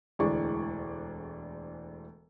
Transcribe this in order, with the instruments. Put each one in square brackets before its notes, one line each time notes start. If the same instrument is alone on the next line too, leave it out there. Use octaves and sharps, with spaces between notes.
[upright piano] E1 D2 E3 G#3 D5 C#6